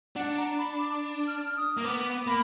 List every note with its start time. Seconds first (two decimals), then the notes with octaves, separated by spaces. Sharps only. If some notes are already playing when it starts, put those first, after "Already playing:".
0.15 D4 F#5
0.37 A#5
0.57 B5
0.78 D6
1.27 F6
1.57 D#6
1.77 A#3
1.84 B3 D6
2.27 A#3 B5